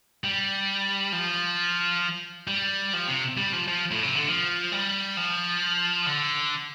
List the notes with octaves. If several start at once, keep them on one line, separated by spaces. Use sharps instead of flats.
G3
F3
G3
F3
C3
G3
F3
F3
A2
C3
D3
F3
G3
F3
D3